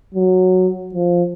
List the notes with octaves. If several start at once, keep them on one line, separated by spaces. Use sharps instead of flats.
F#3
F3